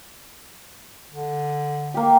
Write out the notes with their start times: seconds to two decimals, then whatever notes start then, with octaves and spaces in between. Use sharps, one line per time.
1.12 D3
1.94 A#3 G4